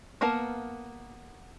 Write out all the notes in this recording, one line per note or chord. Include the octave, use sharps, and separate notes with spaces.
A#3 B3 A#4 F5 A5